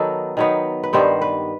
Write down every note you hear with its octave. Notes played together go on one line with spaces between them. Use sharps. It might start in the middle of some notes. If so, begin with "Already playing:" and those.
Already playing: D#3 F#3 B3 D#4 A4
D#3 F#3 B3 D#4
B4
G2 D#3 G3 B3 C5
B4